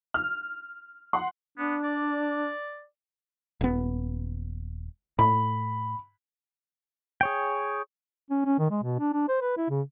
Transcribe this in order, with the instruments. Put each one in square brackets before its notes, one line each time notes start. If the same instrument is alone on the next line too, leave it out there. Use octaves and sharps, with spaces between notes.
[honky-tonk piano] F6
F#5 C6
[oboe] B3 [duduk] D4
[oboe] D5
[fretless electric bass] D#1 B3
[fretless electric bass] A2 [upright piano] B5
[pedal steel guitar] G#4 C#5 G5
[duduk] C#4
C#4
D#3
G#3
B2
D4
D4
C5
B4
E4
C#3